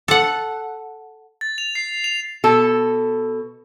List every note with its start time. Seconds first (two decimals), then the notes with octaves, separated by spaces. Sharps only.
0.08 A4 F#5
1.41 A6
1.58 F7
1.75 C7
2.04 F7
2.44 B2 A4